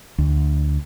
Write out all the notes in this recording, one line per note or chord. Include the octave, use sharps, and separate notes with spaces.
D2